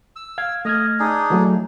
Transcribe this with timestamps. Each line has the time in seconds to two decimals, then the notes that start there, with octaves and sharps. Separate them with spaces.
0.16 E6
0.38 F5 G#6
0.65 A3 D#5 F6 G#6
1.00 D4 D#4 G#4
1.30 E3 F#3 A3